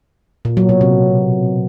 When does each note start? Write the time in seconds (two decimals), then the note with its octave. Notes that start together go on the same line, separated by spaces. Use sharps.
0.45 A#2
0.57 F#3
0.69 B2
0.81 C3